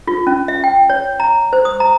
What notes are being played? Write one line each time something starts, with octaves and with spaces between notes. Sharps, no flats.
F4
C#4
E5
G5
C#5
A#5
C5
D#6
A#5